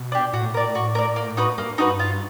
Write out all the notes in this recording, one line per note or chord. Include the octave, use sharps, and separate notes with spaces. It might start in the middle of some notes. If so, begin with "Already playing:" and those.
Already playing: B2
D4 G4
A2 F#4
A#4 D5
F#4
A#4 D5
A#3
D#4 F#4 B4
G2 A#3
D#4 F#4 B4
F4